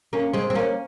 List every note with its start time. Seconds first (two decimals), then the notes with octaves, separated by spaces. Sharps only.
0.13 A#3 C#4
0.33 G#3 C4
0.50 C4
0.55 A#3 C#4